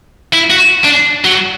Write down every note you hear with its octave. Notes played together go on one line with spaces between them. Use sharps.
E4
F#4
D4
F#3